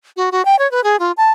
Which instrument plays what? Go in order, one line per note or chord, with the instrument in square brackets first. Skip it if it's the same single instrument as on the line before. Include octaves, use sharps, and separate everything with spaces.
[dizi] F#4
F#4
G5
C#5
B4
G#4
F4
A5